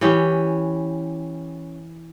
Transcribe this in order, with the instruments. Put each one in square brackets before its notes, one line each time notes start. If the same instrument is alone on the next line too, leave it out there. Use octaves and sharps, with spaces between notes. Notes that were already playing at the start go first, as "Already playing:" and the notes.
[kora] E3 C#4 G4